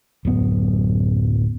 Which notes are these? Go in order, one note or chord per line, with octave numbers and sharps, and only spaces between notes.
D1 F#2 B3